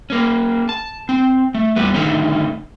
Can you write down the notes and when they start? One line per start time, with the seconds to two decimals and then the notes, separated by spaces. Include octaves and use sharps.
0.10 A#3 C#4
0.69 A5
1.09 C4
1.55 A3
1.76 E2 G3 B3
1.94 D3 D#3 A3 C#4 D#4